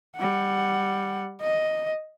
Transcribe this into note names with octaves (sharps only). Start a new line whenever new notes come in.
G3 F#5
D#5